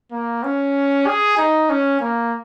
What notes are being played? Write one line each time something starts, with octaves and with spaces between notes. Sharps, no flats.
A#3
C#4
G#4
D#4
C#4
A#3